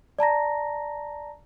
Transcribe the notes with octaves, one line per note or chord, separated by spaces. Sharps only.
D5 A5 A#5 A#6